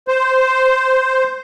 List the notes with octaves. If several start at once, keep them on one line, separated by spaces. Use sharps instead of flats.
C5